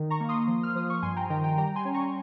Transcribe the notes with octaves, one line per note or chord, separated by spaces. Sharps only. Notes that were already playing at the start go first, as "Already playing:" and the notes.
Already playing: D#3
A#5 C#6
A#3
C6 D#6
F3
F6
F3 D#6
C#6
G2 G#5 C6
G5 A#5
D#3 G5 A#5
G5 A#5
G3 G5 A#5
G#5 C6
C#4
A#5 C#6